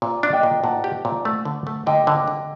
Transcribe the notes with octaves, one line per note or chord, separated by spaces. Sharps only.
A#2
D4
D#5 G5
A#2
A#2 F#5 A5
G4
A#2
A3
D3
A3
D3 D#5 G5
D3
D3